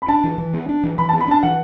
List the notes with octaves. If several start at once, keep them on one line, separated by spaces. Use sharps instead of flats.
B5
D4 A5
E3
E3
B3
D4
E3
E3 B5
A5
B3
B5
D4 A5
E3 F#5